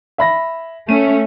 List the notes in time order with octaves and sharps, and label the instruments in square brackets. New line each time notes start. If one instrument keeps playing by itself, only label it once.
[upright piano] E5 B5 A#6
[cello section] A3 C#4 [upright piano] D#7